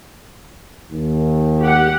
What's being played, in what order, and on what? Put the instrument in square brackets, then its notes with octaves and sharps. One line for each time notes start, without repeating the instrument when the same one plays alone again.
[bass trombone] D#2
[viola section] G4 F#5